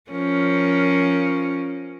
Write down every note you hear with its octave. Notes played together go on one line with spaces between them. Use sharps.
F3 C#4 A#4